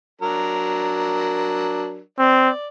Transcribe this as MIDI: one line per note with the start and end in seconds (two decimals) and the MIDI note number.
0.21 2.01 54
0.21 2.01 62
0.21 2.01 70
2.19 2.49 60
2.19 2.68 74